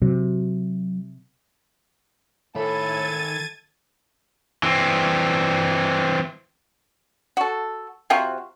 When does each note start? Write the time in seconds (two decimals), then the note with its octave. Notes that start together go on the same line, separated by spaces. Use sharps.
0.02 C3 F#3
2.56 A2 D#3 A4 B5 G#6 A6 D#7
4.63 E3 C4
7.37 F#4 A4
8.10 C3 C4 F4 F#4